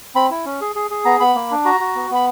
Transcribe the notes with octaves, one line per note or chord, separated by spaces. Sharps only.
C4 B5
E4
C#4
G#4
G#4
G#4
B3 A#5
B3 B5
A#3
D4
F#4 A#5
F#4
B3
B3 B5